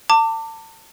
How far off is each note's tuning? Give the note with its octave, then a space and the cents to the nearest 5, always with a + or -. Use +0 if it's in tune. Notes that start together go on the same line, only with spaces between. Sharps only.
A5 +35 D6 +0